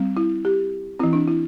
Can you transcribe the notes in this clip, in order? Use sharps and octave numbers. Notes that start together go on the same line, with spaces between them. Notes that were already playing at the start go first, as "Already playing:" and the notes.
Already playing: G3 C4
E4
G4
E3 C4 E4
D4
E4